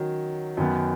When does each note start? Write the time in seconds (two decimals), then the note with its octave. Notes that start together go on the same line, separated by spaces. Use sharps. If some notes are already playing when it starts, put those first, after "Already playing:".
Already playing: D#3 F#3 C#4
0.57 F#2 D#3 B3